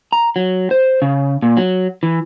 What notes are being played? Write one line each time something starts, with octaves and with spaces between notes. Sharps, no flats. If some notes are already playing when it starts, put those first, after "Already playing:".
A#5
F#3
C5
C#3
A#2
F#3
E3